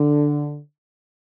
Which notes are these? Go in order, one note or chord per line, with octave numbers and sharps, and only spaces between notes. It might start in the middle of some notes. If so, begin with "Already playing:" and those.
Already playing: D3